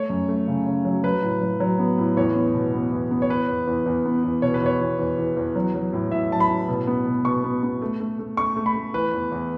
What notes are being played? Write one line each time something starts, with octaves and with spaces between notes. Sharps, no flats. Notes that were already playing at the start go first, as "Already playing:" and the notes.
Already playing: A3 C#5
F#2
A3
C#3
C#3
F#3
F#3 B4
A2
F#3
F#3
B3
A2
E2 C#5
B3
B2
B3
E2
B3
C#5
E3 B4
E2
E2
E2
B3
E2
B2 C#5
B4
E2 C#5
E2
E2
E2
E2
F#3
F#3
A2
A2 E5
F#3 A5
B5
A2
B2
B3
B2
B2 C#6
B3
B3
A3
A3
A3
A3 C#6
A3
B5
A3
E3 B4
E2
E2